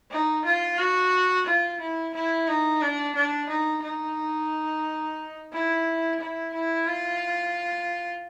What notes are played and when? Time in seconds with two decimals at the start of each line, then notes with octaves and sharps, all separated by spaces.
0.11 D#4
0.45 F4
0.79 F#4
1.47 F4
1.81 E4
2.14 E4
2.48 D#4
2.82 D4
3.16 D4
3.50 D#4
3.84 D#4
5.52 E4
6.20 E4
6.54 E4
6.87 F4